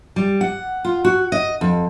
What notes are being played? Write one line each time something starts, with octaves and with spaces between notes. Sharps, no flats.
G3
F#5
F4
F#4
D#5
F2